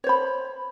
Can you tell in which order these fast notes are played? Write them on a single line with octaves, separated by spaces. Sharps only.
C#5 C5 B5